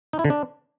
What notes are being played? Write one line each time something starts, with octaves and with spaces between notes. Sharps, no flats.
D#4
E4
D3
D4